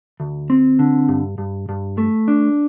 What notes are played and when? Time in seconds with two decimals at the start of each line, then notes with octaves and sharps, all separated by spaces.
0.20 D2
0.50 C4
0.79 D3
1.09 G2
1.38 G2
1.69 G2
1.98 A3
2.28 D4